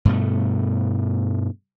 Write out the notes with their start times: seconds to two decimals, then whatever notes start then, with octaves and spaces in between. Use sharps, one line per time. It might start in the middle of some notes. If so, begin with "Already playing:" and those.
0.05 G2 B2 A3